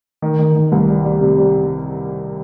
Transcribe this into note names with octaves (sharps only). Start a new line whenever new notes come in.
D#3
D#3
D#3
C2
G3
G3
C3
G3